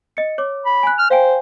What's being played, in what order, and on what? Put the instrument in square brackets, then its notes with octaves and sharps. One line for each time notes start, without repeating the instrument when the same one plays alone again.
[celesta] D#5 C#7
C#5 D6
[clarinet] B5
[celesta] G#5 F#6
[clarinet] F6
[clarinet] C5 [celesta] F5 G5 G#5